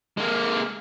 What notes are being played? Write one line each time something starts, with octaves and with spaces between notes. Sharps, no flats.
G#3 A#3